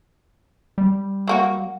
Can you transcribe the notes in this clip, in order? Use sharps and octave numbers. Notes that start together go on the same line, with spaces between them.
G3
F#3 A#3 F#4